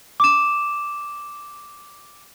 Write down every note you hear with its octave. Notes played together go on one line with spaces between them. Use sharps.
D6 E7